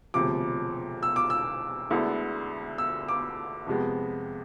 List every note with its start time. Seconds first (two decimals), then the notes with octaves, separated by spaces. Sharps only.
0.14 E1 D2 C3 F3 D6
1.03 E6
1.16 D6
1.30 E6
1.90 D2 D3 G#3 B3 E4
2.78 E6
3.09 D6
3.67 F2 C3 G#3 B3